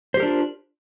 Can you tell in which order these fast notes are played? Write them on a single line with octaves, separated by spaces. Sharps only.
C5 G4 A#4 D4 F4